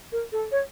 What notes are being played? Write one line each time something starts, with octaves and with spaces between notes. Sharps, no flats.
A#4
A4
C#5